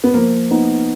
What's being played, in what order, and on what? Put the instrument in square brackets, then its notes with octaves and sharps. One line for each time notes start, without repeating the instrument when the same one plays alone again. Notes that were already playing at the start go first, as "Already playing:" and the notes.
[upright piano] B3
[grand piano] F3 [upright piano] A#3
[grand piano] B3 D#4